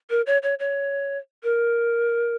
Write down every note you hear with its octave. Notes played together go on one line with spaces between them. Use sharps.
A#4
C#5
C#5
C#5
A#4